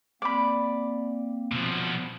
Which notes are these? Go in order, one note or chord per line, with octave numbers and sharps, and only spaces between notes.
A#3 C4 D5 B5
B2 F3